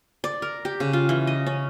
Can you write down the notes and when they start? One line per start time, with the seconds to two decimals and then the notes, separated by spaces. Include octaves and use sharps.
0.24 D5
0.42 A#4
0.65 G4
0.80 C#3
0.93 F4
1.09 E3
1.27 D#5
1.46 C#4